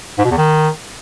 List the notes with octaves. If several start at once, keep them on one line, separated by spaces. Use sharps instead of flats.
G#2
B2
E2
D#3